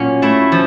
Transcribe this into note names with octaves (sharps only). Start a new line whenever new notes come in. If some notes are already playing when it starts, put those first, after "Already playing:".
Already playing: A#2 F#3 A#3 C#4
A3 E4 E5
F3